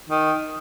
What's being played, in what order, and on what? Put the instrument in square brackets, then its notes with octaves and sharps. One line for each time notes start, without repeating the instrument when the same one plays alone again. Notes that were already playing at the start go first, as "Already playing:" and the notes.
[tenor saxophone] D#3